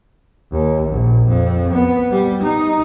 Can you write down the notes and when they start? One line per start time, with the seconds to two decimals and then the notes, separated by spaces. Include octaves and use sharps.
0.52 D#2
0.88 A#1
1.29 F2
1.74 B3
2.12 G3
2.43 D#4